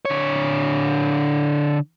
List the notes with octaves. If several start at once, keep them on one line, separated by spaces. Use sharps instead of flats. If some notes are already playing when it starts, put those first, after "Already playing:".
D3 C#5